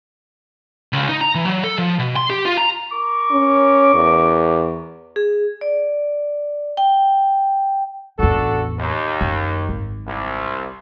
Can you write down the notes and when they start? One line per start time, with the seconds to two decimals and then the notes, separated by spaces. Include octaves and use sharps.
0.93 C#2
1.09 D#4
1.21 A#5
1.35 E3
1.46 F#3
1.64 A4
1.78 F3
1.99 B2
2.16 C6
2.30 G4
2.45 F4
2.58 A#5
2.93 A#4 C#6 D6
3.31 C#4
3.94 E2
5.16 G#4
5.61 D5
6.77 G5
8.19 A1 E2 D4 F#4 A4
8.79 D#2
9.21 F#2
9.69 G#1
10.07 C2